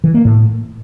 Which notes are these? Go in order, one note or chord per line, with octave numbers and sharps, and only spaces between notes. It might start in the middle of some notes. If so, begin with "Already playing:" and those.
E3
A#3
A2